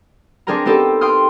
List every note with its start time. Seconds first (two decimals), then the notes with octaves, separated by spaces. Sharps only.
0.47 C4 D4 G#4 A#4 G5 A#5
0.66 B3 C4 D#4 G4 A4
1.01 G5 C6 D#6 F6